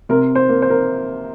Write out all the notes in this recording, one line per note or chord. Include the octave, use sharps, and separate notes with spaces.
C3 A#4
C5
A#3
C5
A#4